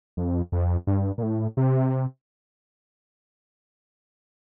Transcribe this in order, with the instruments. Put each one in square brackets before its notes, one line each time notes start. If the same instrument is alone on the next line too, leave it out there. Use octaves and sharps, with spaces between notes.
[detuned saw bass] F2
F2
G2
A#2
A2
C3